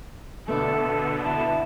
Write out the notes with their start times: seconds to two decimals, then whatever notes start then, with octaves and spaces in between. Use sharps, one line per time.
0.48 B2 D3 A3 B3 A4 D5
1.25 E4 A5